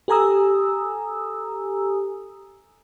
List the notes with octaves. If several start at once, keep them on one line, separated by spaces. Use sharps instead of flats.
G4 A4 G#5 A#5 D#6 E6